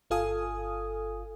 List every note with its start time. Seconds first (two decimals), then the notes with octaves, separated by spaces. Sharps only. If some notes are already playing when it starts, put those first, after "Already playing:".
0.10 G1 F4 A4 F5 G#5 D#6